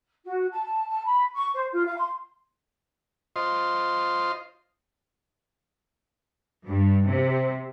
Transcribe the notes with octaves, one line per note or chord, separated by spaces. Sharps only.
F#4
A5
A5
B5
C#6
C5
F4
F5
C6
F4 C5 D#5 C6
G2
C3